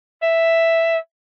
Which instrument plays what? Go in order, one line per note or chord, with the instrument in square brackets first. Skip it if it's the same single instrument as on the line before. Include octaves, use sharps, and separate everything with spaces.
[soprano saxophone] E5